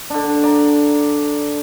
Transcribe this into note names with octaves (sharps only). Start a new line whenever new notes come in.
D3 D4
D5 A#5